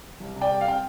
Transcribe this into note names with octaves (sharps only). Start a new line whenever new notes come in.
C2
C3
D5 G5
G3
F5
C4 G5